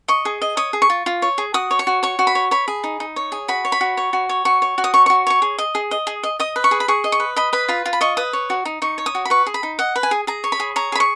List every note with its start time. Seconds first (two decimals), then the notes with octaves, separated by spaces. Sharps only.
0.08 D#5 C#6
0.25 G#4
0.42 D#5
0.57 C#5 D#6
0.73 G#4
0.82 C#6
0.90 F4
1.06 F4
1.22 C#5
1.38 G#4
1.54 F#4 D#6
1.71 C#5
1.79 C#6
1.87 F#4
2.03 C#5 C#6
2.19 F#4
2.27 B5
2.35 C#5
2.51 C#5 B5
2.68 G#4
2.84 D#4
3.00 D#4
3.16 C#5
3.32 G#4
3.48 F#4 B5
3.65 C#5
3.72 B5
3.81 F#4
3.97 C#5
4.13 F#4
4.29 C#5
4.45 F#4 C#6
4.62 C#5
4.78 F#4
4.84 D#6
4.94 C#5 C#6
5.06 C#6
5.10 F#4
5.27 C#5 C#6
5.42 G#4
5.58 D#5
5.75 G#4
5.91 D#5
6.07 G#4
6.23 D#5
6.40 D#5 D#6
6.56 B4
6.64 C#6
6.71 G#4
6.80 B5
6.88 G#4 C#6
7.04 D#5
7.12 C#6
7.20 B4
7.36 D#5 B5
7.53 B4 B5
7.68 F4 B5
7.86 F4
7.93 B5
8.01 D#5 C#6
8.17 B4 D#6
8.33 C#5
8.50 F#4
8.65 D#4
8.82 D#4 C#6
8.98 C#5
9.06 D#6
9.15 F#4
9.25 B5
9.30 B4 C#6
9.46 G#4
9.54 B5
9.63 D#4
9.79 D#5 F#5
9.96 B4
10.03 G#5
10.11 G#4
10.27 G#4 A#5
10.44 C#5
10.52 B5
10.60 G#4
10.76 C#5 A#5
10.92 G#4 B5
11.00 C#6